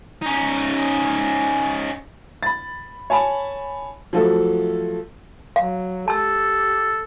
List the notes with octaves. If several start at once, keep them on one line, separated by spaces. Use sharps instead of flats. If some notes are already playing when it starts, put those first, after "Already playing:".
C#4 D#4
B5 A6
C#5 G#5 A5 B5
F3 F#3 A3 A4
F#3 F5
G4 A4 A5 E6